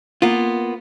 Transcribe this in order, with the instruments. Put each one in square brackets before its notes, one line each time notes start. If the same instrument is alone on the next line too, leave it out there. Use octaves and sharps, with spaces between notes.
[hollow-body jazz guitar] A#3 B3 F4